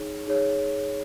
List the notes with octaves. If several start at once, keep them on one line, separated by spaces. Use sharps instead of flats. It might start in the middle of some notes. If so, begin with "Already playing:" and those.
Already playing: D#4 G#4 C#5
D#4 G#4 C#5